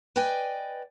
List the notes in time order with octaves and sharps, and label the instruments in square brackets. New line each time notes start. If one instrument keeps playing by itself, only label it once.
[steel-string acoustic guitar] B4 D5 D#5 G5 G#5